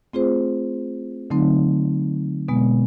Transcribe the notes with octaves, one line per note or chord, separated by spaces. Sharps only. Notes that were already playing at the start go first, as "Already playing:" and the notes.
A3 C4 F4 G#4 C5
D3 F#3 A3 C4 D#4
B2 G#3 B3